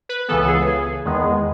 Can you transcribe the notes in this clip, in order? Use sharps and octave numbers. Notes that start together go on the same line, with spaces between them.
B4
C#2 C#3 E3 B3 A4
G#4
G#4
E2 D#3 G#3 B3